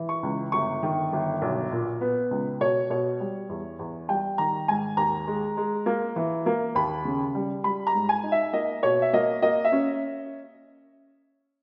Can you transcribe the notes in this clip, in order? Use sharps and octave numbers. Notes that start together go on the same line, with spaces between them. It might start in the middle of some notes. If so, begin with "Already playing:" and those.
Already playing: E3
C#6
C#2
G1 C#6
D#3
G1
B1
A#2
B3
C#2
B2 C#5
B2 C#5
G3
E2
E2
G3 G5
D#3 A#5
G#2 G#5
D#2 A#5
G#3
G#3
A#3
E3
A#3
D#2 B5
C#3
G3
G3 B5
A#5
G#2
G#5
D#4
E5
A#3 D#5
B2 C#5
E5
A#3 D#5
A#3 D#5
E5
C#4